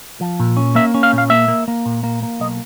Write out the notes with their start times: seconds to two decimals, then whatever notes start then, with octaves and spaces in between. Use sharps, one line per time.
0.21 F3
0.40 A#2
0.57 C#4
0.75 A#3 E5
0.94 C#4
1.03 F5
1.13 A#2
1.18 F5
1.30 A#3 E5
1.48 A#3
1.68 A#3
1.86 A#2
2.03 A#3
2.23 A#3
2.40 B1 D#5